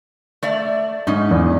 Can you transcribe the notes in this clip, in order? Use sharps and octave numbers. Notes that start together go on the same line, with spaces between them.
A3 D5 E5
G#2 C#4 D#4
E2